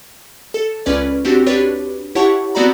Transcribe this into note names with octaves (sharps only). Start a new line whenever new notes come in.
A4
C#2 C#4 B4 D5
C4 D4 F#4 G4
D4 G4 B4 C#5
E4 G4 C#5 F#5 A5 C#6
B3 C4 F#4 D5 A#5 B5